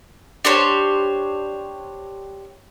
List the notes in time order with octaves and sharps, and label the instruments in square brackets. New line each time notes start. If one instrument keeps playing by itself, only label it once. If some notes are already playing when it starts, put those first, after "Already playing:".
[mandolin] D4 G4 C5 C#5